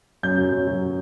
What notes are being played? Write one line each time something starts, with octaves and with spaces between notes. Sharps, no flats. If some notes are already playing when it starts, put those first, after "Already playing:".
F#2 G6
F#3
F#2
F#3